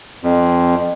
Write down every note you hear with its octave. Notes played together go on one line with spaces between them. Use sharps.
F2